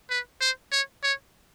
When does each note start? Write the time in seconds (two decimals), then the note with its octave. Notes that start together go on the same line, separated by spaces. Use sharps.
0.10 B4
0.41 C5
0.72 C#5
1.03 C#5